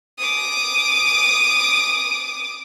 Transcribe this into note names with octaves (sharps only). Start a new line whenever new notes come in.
D6 D#6